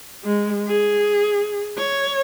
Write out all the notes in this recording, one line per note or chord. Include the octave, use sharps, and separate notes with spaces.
G#3
G#4
C#5